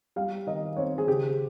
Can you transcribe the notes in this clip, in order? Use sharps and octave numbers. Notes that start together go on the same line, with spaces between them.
G3 F5
D#3 D#5
C4 C#5
G#4
C#3 G4